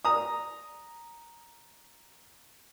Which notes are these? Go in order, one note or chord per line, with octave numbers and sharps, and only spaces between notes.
A#5 D#6